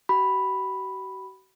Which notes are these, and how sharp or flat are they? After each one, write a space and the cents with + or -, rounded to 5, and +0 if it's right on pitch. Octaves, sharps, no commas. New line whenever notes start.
F#4 +45 B5 +0